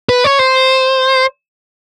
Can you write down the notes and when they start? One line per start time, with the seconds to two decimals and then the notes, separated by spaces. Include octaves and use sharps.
0.09 B4
0.24 C#5
0.39 C5